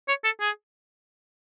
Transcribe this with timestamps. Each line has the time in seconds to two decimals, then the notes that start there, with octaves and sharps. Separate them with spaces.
0.08 C#5
0.24 A4
0.40 G#4